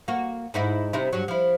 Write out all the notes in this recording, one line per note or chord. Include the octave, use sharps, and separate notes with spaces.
A#3 F#4
G#2 D#4 E4
C3 D#4 E4
G2 F#3
F3 E4